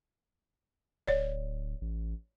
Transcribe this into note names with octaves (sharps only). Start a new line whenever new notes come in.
D1 C#5 D5
A1